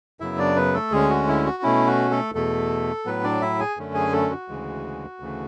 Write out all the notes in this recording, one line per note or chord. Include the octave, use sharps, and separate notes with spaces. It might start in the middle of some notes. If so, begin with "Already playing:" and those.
F#2 C#3 F#3 B3 E4 E5
D4 D5
B3 B4
A3 A4
D2 D3 G#3 C#4 G#4
F#4
E4
F#4
B2 A3 C#4 E4
F#4
A3 A4
E2 B2 A3 A4
A2 F#3 B3 B4
D4 D5
E4 E5
G#4 G#5
F#2 D3 A3 C#4
G#4 G#5
A3 A4
F#4
D2 C#3 E3 G#3
D2 C#3 E3 A3